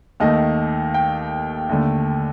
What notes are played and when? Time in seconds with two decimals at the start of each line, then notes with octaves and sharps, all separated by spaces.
0.20 D#2 D#3 A3 D#5
0.94 G5
1.69 D#2 D3 A3